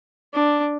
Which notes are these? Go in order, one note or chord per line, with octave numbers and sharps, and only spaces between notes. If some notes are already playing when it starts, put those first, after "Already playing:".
D4